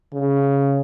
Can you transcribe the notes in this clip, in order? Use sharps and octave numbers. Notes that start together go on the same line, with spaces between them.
C#3